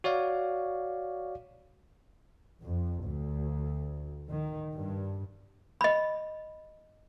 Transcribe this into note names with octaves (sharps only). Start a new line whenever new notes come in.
F#4 C#5 D5 F5
F2
D2
D#3
G2
D#5 B5